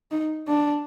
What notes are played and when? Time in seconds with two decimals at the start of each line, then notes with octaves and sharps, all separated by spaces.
0.11 D#4
0.48 D4